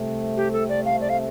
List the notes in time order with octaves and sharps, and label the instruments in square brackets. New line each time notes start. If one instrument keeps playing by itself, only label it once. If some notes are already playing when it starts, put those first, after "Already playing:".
Already playing: [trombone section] C2 C3 A3 C4
[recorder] G4
A4
D5
F5
D5
F5